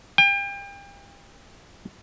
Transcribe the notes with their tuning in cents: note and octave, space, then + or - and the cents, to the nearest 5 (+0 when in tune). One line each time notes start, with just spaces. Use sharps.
G5 +35